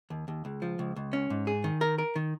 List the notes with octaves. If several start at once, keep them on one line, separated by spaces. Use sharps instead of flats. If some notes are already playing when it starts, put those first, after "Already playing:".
D#2
D#2
C#2
F3
C#2
C#2
C#4
G#2
G#4
D#3
A#4
A#4
D#3